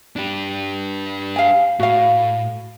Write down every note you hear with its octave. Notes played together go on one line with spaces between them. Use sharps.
D4 G4
F5 G#5
A2 F#4 F5